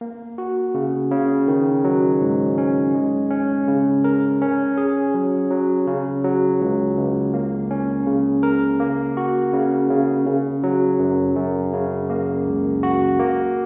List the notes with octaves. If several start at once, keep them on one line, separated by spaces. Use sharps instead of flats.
A#3
F#4
C#3
C#3
D#3
F#3
G#2
C#4
G#3
C#4
C#3
A#4
C#4
G#4
F#3
F#3
C#3
F#3
C#2
C#2
A#3
C#4
C#3
A#4
A#3
F#4
C#3
C#3
C#3
F#3
F#2
F#2
C#3
A#3
C#2
F#4
A#3